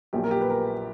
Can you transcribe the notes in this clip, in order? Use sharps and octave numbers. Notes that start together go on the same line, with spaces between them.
A#1 A#2 F#3 G4
A#4
G4
B4
A#4